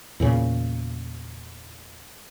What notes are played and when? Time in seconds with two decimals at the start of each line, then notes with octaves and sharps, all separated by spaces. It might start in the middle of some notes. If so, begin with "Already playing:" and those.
0.20 E2 A#2 C#3